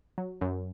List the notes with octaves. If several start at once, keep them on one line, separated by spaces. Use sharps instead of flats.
F#3
F#2